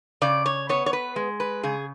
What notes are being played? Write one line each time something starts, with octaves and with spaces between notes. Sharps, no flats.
C#3 D5
C#5
B3 C#5
C#5
B4
G#3
B4
C#3 G#4